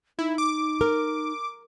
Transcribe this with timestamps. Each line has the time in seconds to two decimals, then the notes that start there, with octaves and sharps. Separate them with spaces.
0.19 D#4 E4
0.38 D6
0.81 A#4